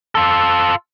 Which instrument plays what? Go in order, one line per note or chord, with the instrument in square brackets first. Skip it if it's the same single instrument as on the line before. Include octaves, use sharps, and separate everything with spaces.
[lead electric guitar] F4 A4